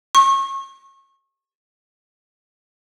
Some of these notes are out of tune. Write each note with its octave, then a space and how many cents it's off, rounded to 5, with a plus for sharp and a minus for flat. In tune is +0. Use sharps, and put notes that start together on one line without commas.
C#6 -30